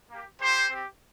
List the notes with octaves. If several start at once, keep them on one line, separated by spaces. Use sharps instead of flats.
A#3 G4
A#3 F4 G4 C5
C4 G4